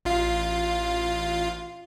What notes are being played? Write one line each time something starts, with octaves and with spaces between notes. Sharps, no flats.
A1 F4 F5